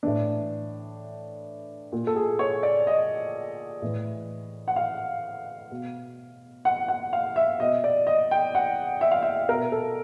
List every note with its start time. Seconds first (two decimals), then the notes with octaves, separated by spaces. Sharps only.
0.03 A2 E3 D4
1.92 A#2
2.07 A4
2.16 G#4
2.39 C#5
2.63 D5
2.87 D#5
3.82 A2 E3
4.68 F#5
4.76 F5
5.71 B2
6.65 F#5
6.88 F#5
7.13 F5
7.36 E5
7.59 B2 D#5
7.84 D5
8.07 D#5
8.31 G5
8.55 F#5
9.01 E5
9.11 F5
9.23 E5
9.49 B2 A#4
9.72 A4